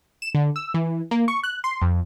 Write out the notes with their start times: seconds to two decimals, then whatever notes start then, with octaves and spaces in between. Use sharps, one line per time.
0.22 E7
0.35 D3
0.56 E6
0.74 E3
1.11 A#3
1.28 C#6
1.43 F#6
1.64 C6
1.82 F2